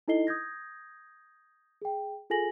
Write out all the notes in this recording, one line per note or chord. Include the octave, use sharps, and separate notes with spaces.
D#4 E4 A4 D#5 C7 G7
D#6 G6 G#6 A#6
G#4 G5
F4 G#4 A4 G#5 A#6 F#7